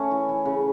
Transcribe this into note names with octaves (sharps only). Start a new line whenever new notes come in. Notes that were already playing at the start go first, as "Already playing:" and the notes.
Already playing: A3 C#4
E3
E3
C#3